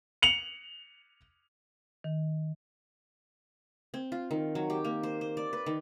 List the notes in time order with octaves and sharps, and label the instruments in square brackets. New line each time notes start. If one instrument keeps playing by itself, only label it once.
[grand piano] C#7 F7 F#7
[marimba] D#3
[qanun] C4
F4
D#3
F#3
G4
A#3
C5
C5
D5
B4
D#3